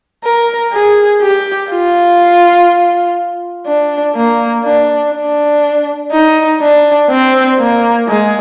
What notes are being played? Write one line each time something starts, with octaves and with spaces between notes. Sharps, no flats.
A#4
G#4
G4
F4
D4
A#3
D4
D4
D#4
D4
C4
A#3
G#3